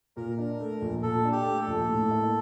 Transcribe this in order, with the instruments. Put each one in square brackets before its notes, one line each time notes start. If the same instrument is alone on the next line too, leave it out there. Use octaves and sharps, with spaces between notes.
[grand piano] A#2 [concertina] A#4
[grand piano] D4
A3
A#1
[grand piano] A#2 [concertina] A4
[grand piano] D4
[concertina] G4
[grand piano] A3
[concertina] A4
[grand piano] A#1
A2
A#3